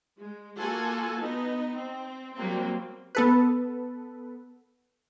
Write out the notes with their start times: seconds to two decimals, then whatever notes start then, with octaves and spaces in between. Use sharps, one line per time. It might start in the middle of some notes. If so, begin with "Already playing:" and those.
0.18 G#3
0.59 A#3 F4 F#4 A4 F#5 G#5
1.19 B3 D#4 D#5
1.74 C4
2.35 F#3 G3 A#3 C4
3.15 B3 A4 B4